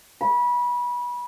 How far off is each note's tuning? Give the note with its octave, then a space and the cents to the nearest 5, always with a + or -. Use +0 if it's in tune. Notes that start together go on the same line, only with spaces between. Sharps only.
B5 -25